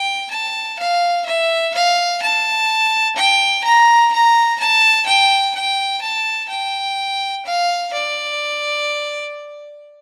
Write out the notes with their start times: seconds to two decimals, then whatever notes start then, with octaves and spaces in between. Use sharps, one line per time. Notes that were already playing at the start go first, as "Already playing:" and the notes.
Already playing: G5
0.31 A5
0.79 F5
1.26 E5
1.74 F5
2.22 A5
3.16 G5
3.64 A#5
4.12 A#5
4.60 A5
5.06 G5
5.55 G5
6.02 A5
6.49 G5
7.45 F5
7.93 D5